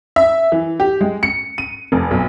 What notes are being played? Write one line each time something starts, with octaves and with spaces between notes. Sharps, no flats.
E5
E3
G4
G#3
C#7
D#7
F1
B1